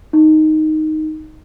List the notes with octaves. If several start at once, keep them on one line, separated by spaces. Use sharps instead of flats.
D#4